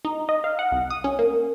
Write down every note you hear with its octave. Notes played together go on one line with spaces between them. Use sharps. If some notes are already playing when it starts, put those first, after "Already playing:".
D#4
D#5
F5
F#5
C2
D#6
C#4
A#3